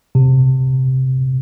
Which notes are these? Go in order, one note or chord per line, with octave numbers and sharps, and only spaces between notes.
C3